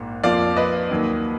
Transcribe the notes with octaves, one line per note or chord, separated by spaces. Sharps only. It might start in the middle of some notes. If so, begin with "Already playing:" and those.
Already playing: A#1 G#2 A#3
F2 F3 A#3 D5 F5
B4 D#5
D#2 D#3 F#3 A#3